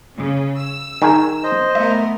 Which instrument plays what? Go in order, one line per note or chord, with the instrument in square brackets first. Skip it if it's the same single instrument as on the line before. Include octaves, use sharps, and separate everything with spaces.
[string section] C#3
E6
[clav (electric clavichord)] D#3 D#4 G#4
[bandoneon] C5 D#5
[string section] A3 B3 A#4 [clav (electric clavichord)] E5